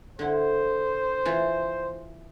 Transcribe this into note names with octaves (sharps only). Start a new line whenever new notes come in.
D3 E4 C5
E3 F4